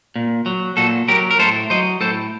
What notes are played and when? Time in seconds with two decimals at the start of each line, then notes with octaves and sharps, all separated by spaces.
0.16 A#2
0.46 F#3
0.77 A#2 F#4 A4
1.08 F#3 G4 A#4
1.31 A#4
1.39 A2 A4 C5
1.70 F#3 C5 D#5
2.01 A2 A4 C5